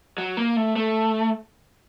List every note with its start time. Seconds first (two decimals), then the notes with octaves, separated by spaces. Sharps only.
0.18 F#3
0.37 A#3
0.56 A3
0.76 A3